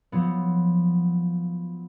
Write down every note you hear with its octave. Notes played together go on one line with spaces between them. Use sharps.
F3 F#3 B3